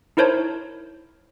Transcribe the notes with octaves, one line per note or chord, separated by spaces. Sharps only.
D#4 E4 A#4 C5 C#5 A5